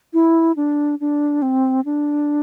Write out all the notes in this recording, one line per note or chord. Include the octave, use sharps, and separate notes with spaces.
E4
D4
D4
C4
D4